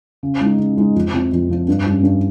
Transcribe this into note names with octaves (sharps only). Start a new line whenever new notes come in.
C#3
G#3 D#4
C#3
G#3 D#4
F2
C3 F3 C4
F2
C3 F3 C4
G2
G3 C#4
G2